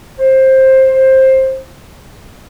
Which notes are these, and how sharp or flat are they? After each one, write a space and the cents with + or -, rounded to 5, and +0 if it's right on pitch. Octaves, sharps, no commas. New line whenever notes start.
C5 +15